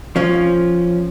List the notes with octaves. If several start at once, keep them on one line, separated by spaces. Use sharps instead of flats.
F3 C#4 F4